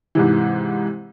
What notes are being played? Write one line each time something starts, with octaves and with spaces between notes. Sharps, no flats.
G#2 C3 E3